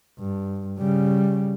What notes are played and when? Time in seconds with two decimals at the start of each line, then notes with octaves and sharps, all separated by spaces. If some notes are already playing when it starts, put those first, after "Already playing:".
0.19 G2
0.78 C#3 G3